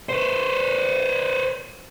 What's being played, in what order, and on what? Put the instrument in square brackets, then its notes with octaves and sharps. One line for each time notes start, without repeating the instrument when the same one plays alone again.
[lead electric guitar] B4 C5